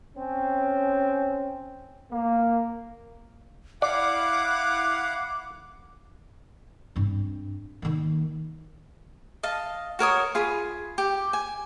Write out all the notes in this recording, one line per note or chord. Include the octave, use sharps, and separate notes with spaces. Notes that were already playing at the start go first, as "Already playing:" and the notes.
C4 C#4
A#3
E4 D5 F5 F#5 D6
G2 C4
D#3 A#3
D#5 F5 A5
F#4 A#4 C#5 D#6
F4 G#4 B5
G4
G#5